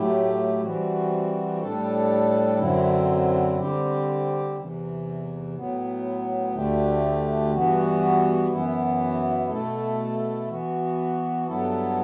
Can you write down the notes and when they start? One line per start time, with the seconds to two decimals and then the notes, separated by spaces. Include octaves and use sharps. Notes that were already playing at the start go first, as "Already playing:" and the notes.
Already playing: A2 F#3 A3 E4 G4
0.62 E3 G3 C4 F#4
1.61 A2 G3 D4 A4
2.59 F#2 D3 F#3 C4 E4
3.58 D3 G3 C4 G4
4.56 E2 C3 E3
5.56 A2 F#3 B3
6.54 D2 D3 A3 D4 G4
7.53 G2 E3 B3 F#4
8.51 F#2 E3 B3 E4
9.49 B2 A3 E4 A4
10.48 E3 B3 F#4
11.47 G2 F#3 B3 E4 A4